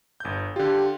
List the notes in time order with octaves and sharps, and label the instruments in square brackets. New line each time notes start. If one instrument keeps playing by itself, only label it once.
[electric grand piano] G1 G6
[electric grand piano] D3 F4 [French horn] G4